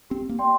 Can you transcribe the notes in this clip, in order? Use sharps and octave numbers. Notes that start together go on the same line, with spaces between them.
C4 G4
A#3
D5 G5 C6